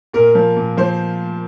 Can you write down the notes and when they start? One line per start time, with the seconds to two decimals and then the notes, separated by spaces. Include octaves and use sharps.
0.13 A#2 A#4
0.35 F3
0.56 A#2
0.77 F3 C5